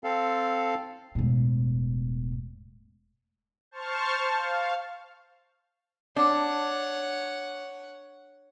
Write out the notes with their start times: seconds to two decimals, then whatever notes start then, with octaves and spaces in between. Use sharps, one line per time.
0.04 C4 A4 F5
1.15 E1 A2
3.71 C5 A5 C#6 F6
4.35 F5
6.16 D4 C#5 F#5